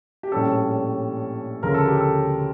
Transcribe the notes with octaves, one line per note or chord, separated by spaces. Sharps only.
G4
A#1 A2 G3 C#4 A4
D2 C#3 F3 A#4
A4
G4
A4